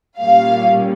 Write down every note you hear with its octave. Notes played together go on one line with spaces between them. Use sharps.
A#2 G3 A#3 C#4 F5